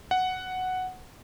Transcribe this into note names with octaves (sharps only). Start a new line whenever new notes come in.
F#5